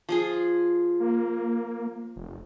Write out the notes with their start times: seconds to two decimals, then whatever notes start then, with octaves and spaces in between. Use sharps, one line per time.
0.09 F3 F4 G#4
1.00 A#3
2.16 F1